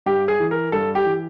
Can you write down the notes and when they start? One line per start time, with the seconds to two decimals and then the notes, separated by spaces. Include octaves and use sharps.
0.06 G2 G4
0.28 G#4
0.40 E3
0.51 A#4
0.72 G2 A4
0.95 G4
1.05 E3